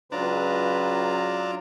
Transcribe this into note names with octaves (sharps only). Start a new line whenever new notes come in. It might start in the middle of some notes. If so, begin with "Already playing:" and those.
C#2 F#3 D4 F4 B4 A#5